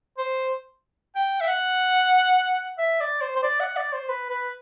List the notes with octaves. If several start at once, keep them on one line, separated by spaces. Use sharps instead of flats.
C5
G5
E5
F#5
E5
D5
C5
C5
D5
F#5
D5
C5
B4
B4